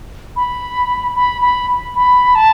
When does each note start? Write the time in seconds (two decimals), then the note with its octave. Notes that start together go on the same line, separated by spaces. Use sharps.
0.36 B5
1.16 B5
1.42 B5
1.96 B5
2.35 A5